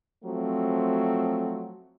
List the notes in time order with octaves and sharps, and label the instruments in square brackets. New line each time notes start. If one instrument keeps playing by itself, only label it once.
[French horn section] F3 F#3 A3 C4